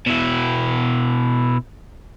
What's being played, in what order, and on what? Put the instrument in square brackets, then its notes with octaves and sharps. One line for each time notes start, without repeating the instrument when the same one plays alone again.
[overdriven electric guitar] B2 E4